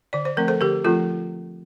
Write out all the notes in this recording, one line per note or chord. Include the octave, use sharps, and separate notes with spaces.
D3 D5
C5
F3 A3 C4 A#4
A4 C5
D3 G4 A#4
F3 A3 C4 F4 A4